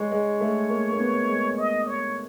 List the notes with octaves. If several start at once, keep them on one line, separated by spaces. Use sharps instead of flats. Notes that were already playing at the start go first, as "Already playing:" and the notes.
Already playing: G#3 C#5
G#3
A3
A#3
A#3
B3
G#3
D#5
C#5